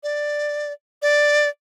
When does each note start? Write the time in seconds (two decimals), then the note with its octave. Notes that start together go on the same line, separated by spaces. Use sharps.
0.03 D5
1.02 D5